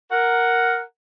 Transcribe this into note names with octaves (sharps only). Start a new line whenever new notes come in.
A#4 F#5